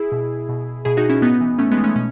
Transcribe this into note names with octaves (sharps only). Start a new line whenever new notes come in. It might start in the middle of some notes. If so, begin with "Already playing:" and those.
Already playing: E4 G#4
B2
B2
B2 E4 G#4
D#4 F#4
C#4 E4
A2 B3 D#4
E3
A2 A3 C#4
G#3 B3
E3
A3 C#4
B2 C#4